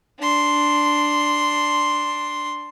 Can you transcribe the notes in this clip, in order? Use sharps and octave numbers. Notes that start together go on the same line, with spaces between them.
D4 C6